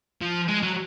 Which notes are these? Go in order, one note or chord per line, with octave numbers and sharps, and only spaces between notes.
F3
G#3
F#3